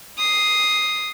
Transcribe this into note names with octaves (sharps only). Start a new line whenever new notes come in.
D#6 C7